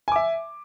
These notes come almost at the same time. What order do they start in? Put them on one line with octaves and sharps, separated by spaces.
G#5 D6 E5